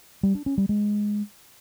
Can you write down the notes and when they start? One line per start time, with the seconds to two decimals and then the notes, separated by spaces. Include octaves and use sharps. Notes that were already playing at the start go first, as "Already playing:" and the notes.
0.23 G3
0.35 D4
0.46 C#4
0.58 G3
0.69 G#3